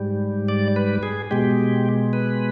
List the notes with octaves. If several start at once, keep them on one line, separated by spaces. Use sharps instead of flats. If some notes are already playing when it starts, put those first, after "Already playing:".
Already playing: G#2 G3
D5
B4
G#4
B2 G#3 G4
B4